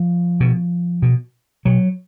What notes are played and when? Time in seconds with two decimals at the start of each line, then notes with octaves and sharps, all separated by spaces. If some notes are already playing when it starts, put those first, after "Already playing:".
Already playing: F3
0.40 B2
1.02 B2
1.65 B2 F#3